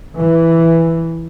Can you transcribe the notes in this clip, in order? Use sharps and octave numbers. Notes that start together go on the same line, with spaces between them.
E3